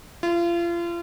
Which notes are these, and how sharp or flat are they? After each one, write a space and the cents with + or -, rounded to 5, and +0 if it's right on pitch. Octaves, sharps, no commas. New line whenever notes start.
F4 -35